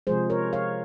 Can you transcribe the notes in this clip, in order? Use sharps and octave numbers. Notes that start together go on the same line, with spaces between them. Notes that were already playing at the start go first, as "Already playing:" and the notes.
C3 F3 G#3 G#4 C5
A#4 C#5
C#5 F5